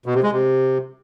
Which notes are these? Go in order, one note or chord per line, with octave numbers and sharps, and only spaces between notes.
B2
C3
G#3
C3